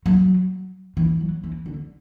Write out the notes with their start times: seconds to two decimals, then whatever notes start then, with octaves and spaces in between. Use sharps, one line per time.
0.06 F#3
0.97 E3
1.20 F#3
1.44 E3
1.66 D3